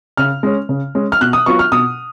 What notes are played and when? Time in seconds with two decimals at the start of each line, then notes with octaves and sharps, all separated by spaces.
0.17 C#3 F6
0.43 G#3 C#4
0.69 C#3
0.95 G#3 C#4
1.12 F6
1.21 B2 F#6
1.33 D#6
1.46 F#3 B3 F4 C#6
1.59 F6
1.72 B2 D#6